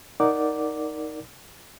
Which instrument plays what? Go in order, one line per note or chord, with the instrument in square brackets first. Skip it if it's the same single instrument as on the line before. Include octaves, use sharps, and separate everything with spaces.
[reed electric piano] D#4 A#4 D5 F#5 D6